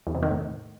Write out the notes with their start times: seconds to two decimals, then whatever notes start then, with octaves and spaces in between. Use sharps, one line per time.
0.07 E2
0.15 C3
0.23 D#3
0.31 A2